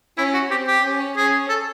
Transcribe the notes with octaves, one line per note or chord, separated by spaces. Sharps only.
C#4 E4
F#4
C4 G4
G4
C#4
C#4 G#4
A4